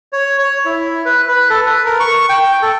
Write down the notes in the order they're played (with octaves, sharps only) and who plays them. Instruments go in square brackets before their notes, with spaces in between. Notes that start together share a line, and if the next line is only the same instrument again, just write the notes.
[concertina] C#5
C#5
E4
B4
B4
A4
B4
A#4
C#6
G5
A4